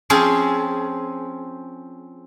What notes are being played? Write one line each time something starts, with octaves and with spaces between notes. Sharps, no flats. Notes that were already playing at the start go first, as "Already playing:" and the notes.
F3 C4 C#4 G#4 F5